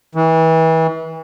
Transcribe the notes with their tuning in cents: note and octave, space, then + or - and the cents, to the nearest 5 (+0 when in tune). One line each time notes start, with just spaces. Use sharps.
E3 -30